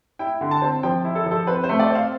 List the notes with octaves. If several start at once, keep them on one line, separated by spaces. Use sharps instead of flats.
E4 G5
D3
A5
C4
F3 G5
E4
A4
F3
A4
C4 B4
C5
A3
D5
C4
F5